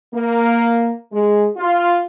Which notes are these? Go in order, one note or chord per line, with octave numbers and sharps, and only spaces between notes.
A#3
G#3
F4